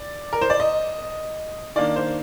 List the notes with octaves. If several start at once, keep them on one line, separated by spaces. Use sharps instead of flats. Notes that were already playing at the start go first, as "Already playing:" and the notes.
Already playing: D5
A#4
C5
D5
D#5
D#3 A#3 D4 D5
C5